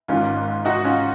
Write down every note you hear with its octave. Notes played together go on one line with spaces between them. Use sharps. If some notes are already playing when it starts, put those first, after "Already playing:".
G#1 G#2 D#3 C#4 F4
D#4 F#4
C#4 F4